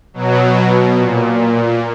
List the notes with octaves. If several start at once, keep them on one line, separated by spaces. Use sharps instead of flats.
B2 F#3
A#2